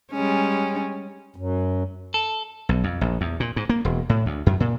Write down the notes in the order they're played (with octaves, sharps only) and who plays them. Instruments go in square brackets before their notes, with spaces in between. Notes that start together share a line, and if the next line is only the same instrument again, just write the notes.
[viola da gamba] G3 G#3 C#4
[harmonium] F#2
[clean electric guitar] A4
[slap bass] B1
F2
A#1
E2
A#2
G#2
A#3
E1
A2
D2
F#2
A#2